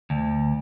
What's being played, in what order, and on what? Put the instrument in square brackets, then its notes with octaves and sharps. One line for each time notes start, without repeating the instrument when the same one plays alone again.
[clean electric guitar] D2